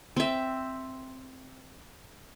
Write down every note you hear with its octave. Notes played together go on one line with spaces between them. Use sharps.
C4 E5